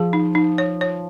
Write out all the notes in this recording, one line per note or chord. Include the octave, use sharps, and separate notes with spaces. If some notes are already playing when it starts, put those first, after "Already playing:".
Already playing: F3 G#4
D#4
D#4
C#5
C#5